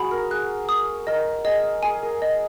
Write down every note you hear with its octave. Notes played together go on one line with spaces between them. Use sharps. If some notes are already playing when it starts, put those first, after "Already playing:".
Already playing: F#4 G#4 B5
A#4
G#4 F#6
D#6
A#4 D#5
G#4 D#5
G#4 G#5
A#4
D#5